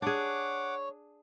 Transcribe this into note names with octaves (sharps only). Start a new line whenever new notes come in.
D4 G#4 C#5 F#5 D6